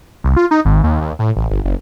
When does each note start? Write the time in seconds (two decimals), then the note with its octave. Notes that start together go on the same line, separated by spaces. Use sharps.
0.24 C2
0.36 F4
0.51 D#4
0.65 G#1
0.84 D#2
1.01 D#2
1.19 A2
1.36 A1
1.51 G1
1.64 F#1